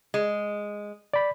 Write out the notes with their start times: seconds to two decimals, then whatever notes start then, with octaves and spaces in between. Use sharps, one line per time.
0.14 G#3
1.14 D5 B5